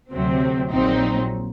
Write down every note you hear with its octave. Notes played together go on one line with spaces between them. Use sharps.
D2 C3 F#3 C4
A#1 A#2 F#3 C4 D#4